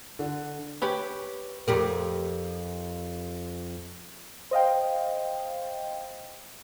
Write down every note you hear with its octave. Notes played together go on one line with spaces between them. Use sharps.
D3
G4 B4 C#5 B5
F2 G4 A#4
C5 D#5 F5 G5